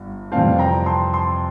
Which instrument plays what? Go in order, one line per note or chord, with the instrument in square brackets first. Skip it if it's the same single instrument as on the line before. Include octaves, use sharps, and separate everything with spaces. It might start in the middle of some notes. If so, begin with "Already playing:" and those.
Already playing: [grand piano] G1 G2
F2 C3 E3 G3 C4 F5 A5
G5 A#5
A5 C6
A5 C6